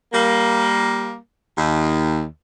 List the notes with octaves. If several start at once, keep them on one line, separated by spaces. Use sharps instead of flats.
G3 A#3
D#2